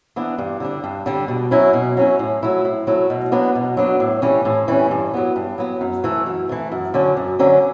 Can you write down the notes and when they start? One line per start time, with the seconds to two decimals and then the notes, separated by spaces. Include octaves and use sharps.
0.16 E3 B3 D4
0.38 G2
0.60 D3 G3 D4
0.84 G2
1.06 D3 G3 D4
1.28 B2
1.51 F#3 C#4 E4
1.73 B2
1.97 F#3 C#4 E4
2.19 A2
2.43 F#3 A3 E4
2.65 A2
2.87 F#3 A3 E4
3.10 B2
3.32 F#3 B3 D4
3.55 B2
3.77 F#3 B3 D4
4.00 A2
4.22 E3 G3 C#4
4.45 A2
4.68 E3 G3 C#4
4.91 G2
5.14 F#3 B3
5.36 G2
5.58 F#3 B3
5.81 F#2
6.04 E3 A3
6.27 F#2
6.49 E3 A3
6.72 F#2
6.94 D3 F#3 C#4
7.17 F#2
7.39 D3 F#3 C#4